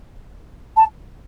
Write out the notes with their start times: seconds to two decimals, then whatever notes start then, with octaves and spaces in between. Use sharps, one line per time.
0.76 A5